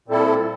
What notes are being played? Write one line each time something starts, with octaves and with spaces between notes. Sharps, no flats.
A#2 G3 C4 E4 A4